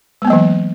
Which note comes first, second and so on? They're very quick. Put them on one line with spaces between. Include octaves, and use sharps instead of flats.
G#3 B3 A#3 F#3 E3